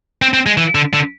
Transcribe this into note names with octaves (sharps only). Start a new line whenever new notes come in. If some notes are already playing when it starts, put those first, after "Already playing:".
C4
C4
G#3
E3
D3
D3